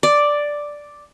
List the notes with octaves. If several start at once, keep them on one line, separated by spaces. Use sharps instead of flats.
D5